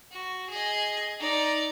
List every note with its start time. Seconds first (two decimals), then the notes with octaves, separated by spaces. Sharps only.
0.11 F#4
0.50 G#4 D#5
1.20 D#4 D5